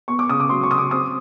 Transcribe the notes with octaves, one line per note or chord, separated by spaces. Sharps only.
B3 C#6
D6
C#3 D#6
D6
F#3 C6
C#6
C#3 D#6
D6
C4 D#6